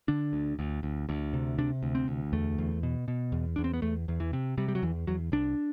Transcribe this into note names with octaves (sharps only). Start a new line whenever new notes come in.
D3 D4
D2
D2
D2
D2
C3
C3 D4
D2
C4
D2
E2 A3
E2
B2
B2
E2
E2 D4
C4
B3
E2 A3
E2
E3
C3
C3 G3
G3
F#3
E2 E3
E2 F#3
C2 D4